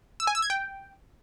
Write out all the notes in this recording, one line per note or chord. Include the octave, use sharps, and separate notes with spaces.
E6
G#5
E6
G#6
G5